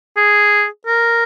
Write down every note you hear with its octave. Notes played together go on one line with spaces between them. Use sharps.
G#4
A#4